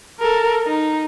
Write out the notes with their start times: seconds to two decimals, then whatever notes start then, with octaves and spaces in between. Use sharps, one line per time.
0.20 A4 A#4
0.66 D#4